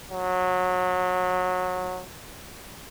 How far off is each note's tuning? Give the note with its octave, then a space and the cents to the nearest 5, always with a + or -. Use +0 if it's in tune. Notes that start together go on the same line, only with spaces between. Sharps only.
F#3 -20